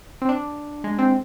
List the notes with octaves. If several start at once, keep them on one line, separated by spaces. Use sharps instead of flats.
C4
D4
G#3
C4